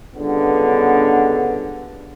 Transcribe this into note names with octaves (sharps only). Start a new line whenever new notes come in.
C#2 G2 D3 B3